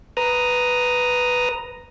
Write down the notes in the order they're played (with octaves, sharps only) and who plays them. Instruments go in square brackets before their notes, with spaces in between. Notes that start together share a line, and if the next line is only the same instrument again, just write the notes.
[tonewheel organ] B4 A#5 D#6